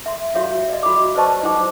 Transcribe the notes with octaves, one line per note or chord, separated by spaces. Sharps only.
E5 C6
F#4 G4 C#5 E5 F5
D5 D#5
F#4 B5 D6
B4 C5 D5 D#5 A5 C#6
D#4 E4 C5 G5 D6